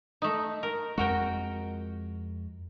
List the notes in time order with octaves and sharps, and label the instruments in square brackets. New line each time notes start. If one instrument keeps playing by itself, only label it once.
[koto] A3 D#4
A#4
[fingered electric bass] F2 G#3 [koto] F#4 A#4 G5